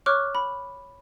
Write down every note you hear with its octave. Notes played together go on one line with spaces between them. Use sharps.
C#5 C#6 D6 F6 F#6
B5